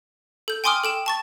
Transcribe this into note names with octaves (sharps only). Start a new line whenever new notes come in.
A4 G6
G5 G#5 C6 D6 D#6 F6
A4 G5 E7
A5 C#6 A6